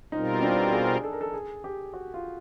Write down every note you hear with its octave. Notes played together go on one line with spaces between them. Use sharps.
B2 G3 C4 D#4 F4 A#4
D4
G#4
A4
A#4
A4
G#4
G4
F#4
F4